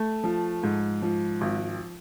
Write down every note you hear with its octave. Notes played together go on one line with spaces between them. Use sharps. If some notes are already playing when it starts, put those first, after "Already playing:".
Already playing: A3
F3
G#2
F3
G#1